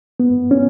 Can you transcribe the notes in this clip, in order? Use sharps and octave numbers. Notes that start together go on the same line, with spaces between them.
B3
C#4